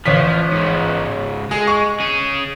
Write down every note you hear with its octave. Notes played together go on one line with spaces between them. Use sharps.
A1 F3 C#4 B6
G#2 C#3
G#3 G#4
C#6
C#4 G#4